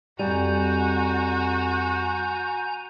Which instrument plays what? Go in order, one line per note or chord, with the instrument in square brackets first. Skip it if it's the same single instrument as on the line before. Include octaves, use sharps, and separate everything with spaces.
[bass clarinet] F2 [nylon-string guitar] G3 [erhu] F#4 [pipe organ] G#5 A#5 G6